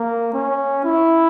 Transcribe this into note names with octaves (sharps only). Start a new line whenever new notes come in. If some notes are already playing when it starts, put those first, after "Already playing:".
Already playing: A#3
C#4
E4